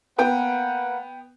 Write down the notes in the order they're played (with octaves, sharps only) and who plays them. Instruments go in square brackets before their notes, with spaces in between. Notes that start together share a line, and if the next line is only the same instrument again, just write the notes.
[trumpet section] A#3 B4 F#5 [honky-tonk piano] B3 G5